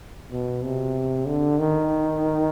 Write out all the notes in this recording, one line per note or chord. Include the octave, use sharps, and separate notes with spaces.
B2
C3
D3
D#3